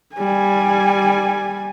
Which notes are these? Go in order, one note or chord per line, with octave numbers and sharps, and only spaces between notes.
G3 G#5